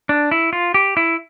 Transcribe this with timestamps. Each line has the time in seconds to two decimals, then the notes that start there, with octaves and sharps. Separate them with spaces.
0.09 D4
0.31 E4
0.53 F4
0.74 G4
0.97 E4